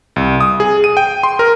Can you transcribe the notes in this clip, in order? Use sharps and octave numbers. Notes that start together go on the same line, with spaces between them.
C2
D#6
G#4
D#7
G5
C6
A#4